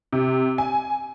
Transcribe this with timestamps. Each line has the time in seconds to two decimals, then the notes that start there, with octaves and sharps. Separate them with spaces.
0.13 C3
0.58 G#5